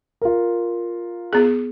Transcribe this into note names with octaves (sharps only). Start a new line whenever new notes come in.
F4 A#4
B3 G#4